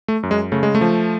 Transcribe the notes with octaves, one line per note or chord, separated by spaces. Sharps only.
A3
F#2
G#3
C#3 A3
G#3
A3
F3